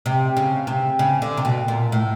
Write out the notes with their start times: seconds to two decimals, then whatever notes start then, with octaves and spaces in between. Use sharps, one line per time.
0.06 C3
0.37 C#3
0.67 C3
0.99 C#3
1.22 D3
1.37 C3
1.45 B2
1.68 A#2
1.92 A2